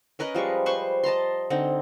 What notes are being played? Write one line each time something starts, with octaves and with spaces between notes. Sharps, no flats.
C#4 A#4 B4 D#5
F3 G3 G#3 C#6
B4 C5 C6 C#6
D#5 A5 A#5 C6
D3 C4 D#4